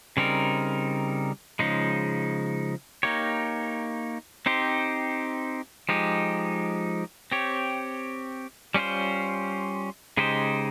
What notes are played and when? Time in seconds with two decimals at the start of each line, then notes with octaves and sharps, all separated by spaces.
0.17 C#3 G3 C4 D#4 A#4
1.59 C#3 F3 G#3 D#4
3.03 A#3 D#4 G4 C#5
4.46 C4 D#4 G4 C5
5.89 F3 G#3 D#4 G4
7.32 C4 G4 C#5
8.74 G3 C#4 F4 C5
10.17 C#3 G#3 D#4 G4 C5